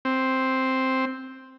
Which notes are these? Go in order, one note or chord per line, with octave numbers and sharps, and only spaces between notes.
C4